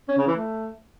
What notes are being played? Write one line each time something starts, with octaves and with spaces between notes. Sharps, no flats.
C#4
C#3
E3
A3